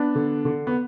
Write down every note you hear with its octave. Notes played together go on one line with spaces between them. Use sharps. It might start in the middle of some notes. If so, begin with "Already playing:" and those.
Already playing: B3 D4
D3
D3
B3